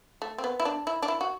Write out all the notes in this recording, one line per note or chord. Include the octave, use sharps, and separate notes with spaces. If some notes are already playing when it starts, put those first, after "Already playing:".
A3
C4
B3
E4
D4
E4
D4
E4
F#4